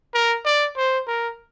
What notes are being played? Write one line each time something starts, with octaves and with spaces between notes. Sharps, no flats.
A#4
D5
C5
A#4